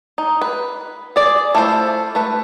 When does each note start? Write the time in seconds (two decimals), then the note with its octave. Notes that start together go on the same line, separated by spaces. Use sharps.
0.18 D#4
0.41 B4
1.16 G#4 D5
1.55 A3 E4 F4 C5
2.15 A3 B4